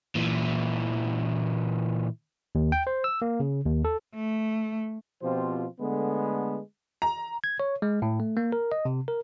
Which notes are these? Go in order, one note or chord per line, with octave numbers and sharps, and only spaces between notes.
A#2 E3
D#2
G5
C5
E6
A#3
C#3
D#2
A4
A3
B2 F3 C4 F4 G4 C5
D3 G#3 A3 B3
A#5
G#6
C#5
G#3
A2
A3
A#3
A#4
D#5
C3
A#4